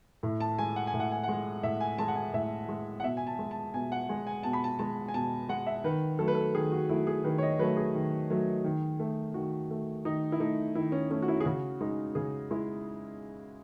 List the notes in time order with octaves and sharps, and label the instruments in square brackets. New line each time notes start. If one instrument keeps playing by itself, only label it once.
[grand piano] A2
A5
G#3 G#5
F#5
G#5
A2
F#5
G#5
G#3 F#5
A2 E5
G#5
G#3 A5
F#5
G#5
A2 E5
G#3
F#5
B2 E5
G#5
A5
G#3
A5
B2 G#5
F#5
G#3 G#5
G#5
B2 A5
B5
A5
G#3 A5
G#5
B2 A5
G#3 F#5
E5
D#3 B4
F#3 A3 A4
B4
A4
D#3 G#4
F#4
F#3 A3 E4
G#4
D#3 B4
C#5
D#5
F#3 A3 B4
G#4
D#3
F#3 A3
D#3
A3
D#3 F#4
A3
D#3 D#4
E4
A3 D#4
D#3 E4
C#4
A3 C#4
F#4
E4
G#4
C#3 F#4
G#3 D#4
C#3 G#4
G#3 E4